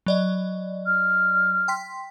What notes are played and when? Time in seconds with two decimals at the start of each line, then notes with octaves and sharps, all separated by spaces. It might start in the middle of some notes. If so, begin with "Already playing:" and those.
0.06 F#3 D5 D#5
0.86 F6
1.68 G5 C6 B6